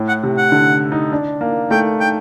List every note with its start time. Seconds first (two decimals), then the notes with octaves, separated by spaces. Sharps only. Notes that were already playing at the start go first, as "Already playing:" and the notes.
Already playing: A2
0.08 F#5
0.23 C3
0.38 F#5
0.52 D3
0.92 D#4
1.12 D4
1.41 A#3
1.71 A3 G5
2.00 G5